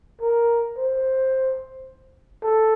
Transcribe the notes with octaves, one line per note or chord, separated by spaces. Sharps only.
A#4
C5
A4